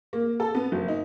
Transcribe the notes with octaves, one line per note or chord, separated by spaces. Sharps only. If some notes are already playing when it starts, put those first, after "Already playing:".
A#3
A4
B3
F#1
D#4